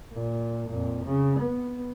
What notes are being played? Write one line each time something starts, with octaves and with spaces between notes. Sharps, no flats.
A#2
F2 A#2
C#3
B3